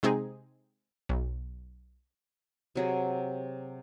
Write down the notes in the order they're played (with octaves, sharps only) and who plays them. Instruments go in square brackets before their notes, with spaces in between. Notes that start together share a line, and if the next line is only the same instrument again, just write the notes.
[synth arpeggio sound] C3 G#3 C4 D#4 G#4
B1
[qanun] C3 F#3 G#4